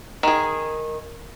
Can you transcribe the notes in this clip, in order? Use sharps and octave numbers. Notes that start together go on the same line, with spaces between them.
D#3 G#4